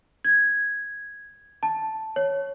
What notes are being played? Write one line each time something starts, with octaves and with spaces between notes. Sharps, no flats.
G#6
A5
C#5